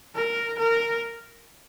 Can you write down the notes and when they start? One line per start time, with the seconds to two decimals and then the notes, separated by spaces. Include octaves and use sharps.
0.15 A#4
0.59 A#4